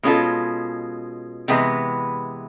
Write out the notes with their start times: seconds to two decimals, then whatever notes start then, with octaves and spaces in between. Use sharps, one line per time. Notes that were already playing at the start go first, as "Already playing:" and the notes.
0.03 B2 G#3 C#4 F4 A4
1.48 C3 E3 G#3 B3